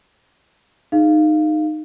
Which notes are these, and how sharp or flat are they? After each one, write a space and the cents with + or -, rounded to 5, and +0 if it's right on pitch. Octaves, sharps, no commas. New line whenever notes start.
D#4 -15 G#4 +0 F5 -10